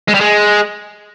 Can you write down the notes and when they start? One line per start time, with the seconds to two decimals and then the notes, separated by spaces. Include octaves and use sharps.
0.08 G#3
0.14 G3
0.21 G#3